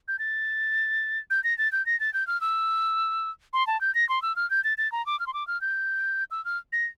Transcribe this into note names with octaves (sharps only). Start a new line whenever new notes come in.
G6
A6
G6
A#6
A6
G6
A#6
A6
G6
F6
E6
C6
A5
G6
A#6
C6
E6
F6
G6
A6
A6
A#5
D6
F6
C6
D6
F6
G6
E6
F6
A#6